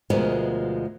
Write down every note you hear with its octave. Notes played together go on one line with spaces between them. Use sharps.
D2 B2 F3 G#3 A#4